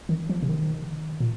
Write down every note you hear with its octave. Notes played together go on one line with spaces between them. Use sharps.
D#3
F3
C3
D#3
A#2